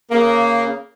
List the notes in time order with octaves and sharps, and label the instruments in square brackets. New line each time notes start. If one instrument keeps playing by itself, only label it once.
[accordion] C#3 [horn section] A#3